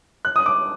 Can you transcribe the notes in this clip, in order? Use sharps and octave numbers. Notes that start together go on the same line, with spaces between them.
F#6
D#6
D6